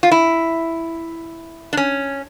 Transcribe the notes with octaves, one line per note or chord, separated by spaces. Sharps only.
F4
E4
D4
C#4